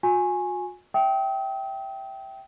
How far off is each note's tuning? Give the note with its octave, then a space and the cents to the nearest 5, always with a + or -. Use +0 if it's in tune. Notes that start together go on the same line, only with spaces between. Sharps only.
F#4 -45 G#5 +0 C#6 -30
E5 +0 G5 -10 D#6 +40